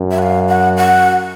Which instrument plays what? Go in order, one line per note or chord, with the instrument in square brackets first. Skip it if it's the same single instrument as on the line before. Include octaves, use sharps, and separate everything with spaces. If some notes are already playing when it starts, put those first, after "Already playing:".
Already playing: [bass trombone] F#2
[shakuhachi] E5
F#5
F5
F#5
F#5